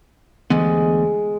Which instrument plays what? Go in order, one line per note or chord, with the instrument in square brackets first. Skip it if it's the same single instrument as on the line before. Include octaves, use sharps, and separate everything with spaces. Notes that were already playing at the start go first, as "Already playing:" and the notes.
[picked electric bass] D2 E3 B3 [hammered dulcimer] G#3